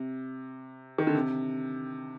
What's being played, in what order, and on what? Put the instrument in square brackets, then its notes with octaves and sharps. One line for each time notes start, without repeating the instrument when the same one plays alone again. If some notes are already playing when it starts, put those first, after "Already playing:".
Already playing: [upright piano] C3
D#3
D3
C3